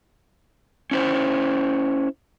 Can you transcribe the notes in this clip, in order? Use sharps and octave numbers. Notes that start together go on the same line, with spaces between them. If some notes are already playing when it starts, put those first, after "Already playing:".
C#4 E4 C5